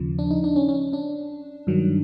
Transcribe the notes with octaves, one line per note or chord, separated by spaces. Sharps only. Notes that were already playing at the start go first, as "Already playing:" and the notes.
Already playing: D#2 C#3 F3
D4
D#4
D4
C#4
C#4
D4
G2 D#3 F#3